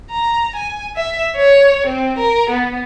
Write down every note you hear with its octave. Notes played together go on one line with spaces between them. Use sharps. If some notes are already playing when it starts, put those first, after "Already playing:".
A#5
G#5
E5
C#5
C4
A#4
B3